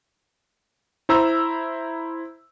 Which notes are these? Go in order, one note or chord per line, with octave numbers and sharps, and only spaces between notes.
E4 C5 A#5 E6